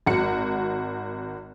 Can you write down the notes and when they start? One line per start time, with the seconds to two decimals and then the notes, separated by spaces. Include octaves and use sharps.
0.07 G#1 F#4 C#7